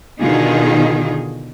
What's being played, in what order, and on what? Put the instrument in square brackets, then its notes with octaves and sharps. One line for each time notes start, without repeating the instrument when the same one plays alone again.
[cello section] B2 D3 D#3 D#4 F4 G#4